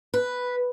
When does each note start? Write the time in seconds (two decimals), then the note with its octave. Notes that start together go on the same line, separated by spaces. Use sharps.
0.14 B4